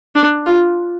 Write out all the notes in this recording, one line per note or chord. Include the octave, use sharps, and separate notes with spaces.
D4
F4